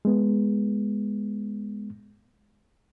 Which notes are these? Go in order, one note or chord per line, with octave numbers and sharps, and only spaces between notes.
G#3 B3